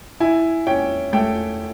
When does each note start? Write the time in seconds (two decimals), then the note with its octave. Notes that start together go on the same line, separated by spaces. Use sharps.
0.20 E4 G#5
0.67 C#4 G5
1.13 A3 G5